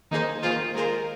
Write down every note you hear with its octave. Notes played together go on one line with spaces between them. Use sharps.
D#3 A#3 D#4 G#4 C5
D#3 A#3 F4 G#4 C5
G#3 F4 G#4 A#4 C5